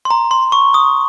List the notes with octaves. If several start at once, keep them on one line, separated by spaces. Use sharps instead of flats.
C6
A#5
C6
C#6
D#6